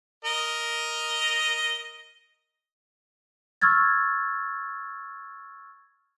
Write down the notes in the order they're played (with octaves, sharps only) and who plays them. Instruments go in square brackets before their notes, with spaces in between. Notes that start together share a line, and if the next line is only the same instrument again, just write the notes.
[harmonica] A#4 D#5
[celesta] C#6 E6 F6 G#6 A6